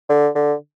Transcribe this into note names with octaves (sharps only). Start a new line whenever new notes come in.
D3
D3